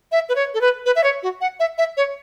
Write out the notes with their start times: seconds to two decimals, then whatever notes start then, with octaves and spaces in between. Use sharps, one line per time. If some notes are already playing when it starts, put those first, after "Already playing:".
0.12 E5
0.29 B4
0.35 C#5
0.54 A4
0.61 B4
0.86 B4
0.96 E5
1.04 C#5
1.23 F#4
1.41 F#5
1.60 E5
1.78 E5
1.97 C#5